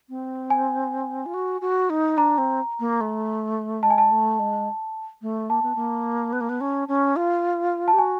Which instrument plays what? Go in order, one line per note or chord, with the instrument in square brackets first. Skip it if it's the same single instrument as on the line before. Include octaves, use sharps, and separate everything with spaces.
[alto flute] C4
[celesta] G#5
[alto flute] F4
F#4
F#4
D#4
[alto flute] D4 [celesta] A#5
[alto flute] C4
A#3
A3
[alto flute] G#3 [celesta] A5
[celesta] G#5
A5
[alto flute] A3
G#3
A3
[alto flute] A#3 [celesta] A5
[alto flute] B3
A#3
B3
A#3
B3
C#4
C#4
F4
[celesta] A5
[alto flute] G4
[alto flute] F#4 [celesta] G#5